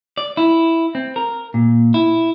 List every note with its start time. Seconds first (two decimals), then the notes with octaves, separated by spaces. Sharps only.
0.17 D5
0.37 E4
0.95 C4
1.16 A#4
1.54 A#2
1.94 E4